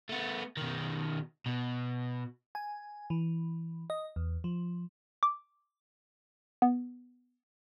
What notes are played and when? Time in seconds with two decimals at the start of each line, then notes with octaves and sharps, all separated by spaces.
0.10 A3 B3
0.57 B2 D#3
1.46 B2
2.55 G#5
3.10 E3
3.90 D#5
4.16 E2
4.44 F3
5.23 D6
6.62 B3